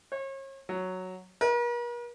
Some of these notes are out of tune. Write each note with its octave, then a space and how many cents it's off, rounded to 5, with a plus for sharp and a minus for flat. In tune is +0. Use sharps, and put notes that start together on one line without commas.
C#5 -40
F#3 +0
A#4 +45